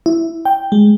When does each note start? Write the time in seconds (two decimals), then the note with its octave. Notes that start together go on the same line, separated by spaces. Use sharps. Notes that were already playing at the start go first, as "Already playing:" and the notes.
0.06 E4
0.45 G5
0.72 G#3